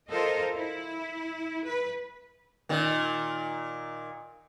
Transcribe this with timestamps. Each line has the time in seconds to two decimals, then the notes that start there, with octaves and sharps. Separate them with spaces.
0.11 F4 A4 A#4 C5 D#5
0.55 E4
1.66 B4
2.69 A#2 D#3